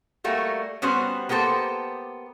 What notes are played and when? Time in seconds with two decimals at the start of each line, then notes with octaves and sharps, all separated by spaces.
0.24 G3 A3 A#3 F#4
0.82 G3 B3 C#4 F#4 C5
1.29 A#3 B3 G4 A4 C5